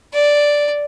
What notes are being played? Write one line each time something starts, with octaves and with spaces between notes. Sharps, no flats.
D5